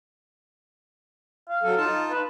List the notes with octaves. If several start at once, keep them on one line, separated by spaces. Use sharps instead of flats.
F5
F#3 A4
D#4 F4 A5
B4